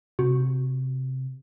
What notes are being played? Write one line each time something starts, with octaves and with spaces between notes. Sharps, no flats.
C3 F#4